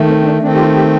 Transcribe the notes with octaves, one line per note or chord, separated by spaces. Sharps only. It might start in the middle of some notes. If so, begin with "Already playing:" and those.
Already playing: D#3 A3
C4
C4
D4
D#3 A3 C4 D4
G4
F4
G4